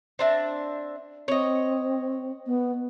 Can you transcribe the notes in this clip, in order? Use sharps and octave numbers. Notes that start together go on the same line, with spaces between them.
C4 D4 E5
C4 C#5 D#5
B3